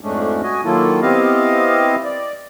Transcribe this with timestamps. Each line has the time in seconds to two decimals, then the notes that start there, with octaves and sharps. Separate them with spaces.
0.01 F2 G#2 G#3 A3 C#4 D4
0.43 F#4 D#5 G#5
0.65 D#3 F#3 A#3 E4 F4 A4
1.02 B3 C4 E4 G4 D#5 F5
2.04 D5